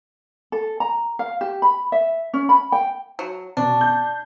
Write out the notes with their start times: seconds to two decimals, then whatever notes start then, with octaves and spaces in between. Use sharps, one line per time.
0.52 A4
0.80 A#5
1.19 F5
1.41 G4
1.62 B5
1.92 E5
2.34 C#4
2.49 B5
2.72 G5
3.19 F#3
3.57 B2 D4
3.81 G6